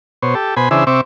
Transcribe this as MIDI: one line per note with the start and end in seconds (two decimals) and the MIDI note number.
0.22 0.35 47
0.22 0.35 72
0.22 0.35 73
0.35 0.55 67
0.35 0.55 69
0.57 0.69 47
0.57 0.69 72
0.57 0.69 80
0.57 0.69 83
0.71 0.84 49
0.71 0.84 52
0.71 0.84 62
0.71 0.84 68
0.71 0.84 72
0.71 0.84 76
0.87 1.01 48
0.87 1.01 60
0.87 1.01 76
0.87 1.01 85
0.87 1.01 86